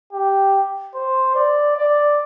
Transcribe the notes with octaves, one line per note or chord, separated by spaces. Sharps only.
G4
C5
D5
D5